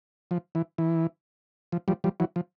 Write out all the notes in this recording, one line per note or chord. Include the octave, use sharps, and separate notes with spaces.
F3
E3
E3
F3
F3 G3
F3 G3
E3 F#3
F3